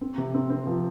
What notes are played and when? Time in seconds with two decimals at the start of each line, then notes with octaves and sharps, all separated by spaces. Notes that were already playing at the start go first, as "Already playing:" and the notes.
0.01 C4
0.18 C3
0.34 C4
0.50 C4
0.67 F3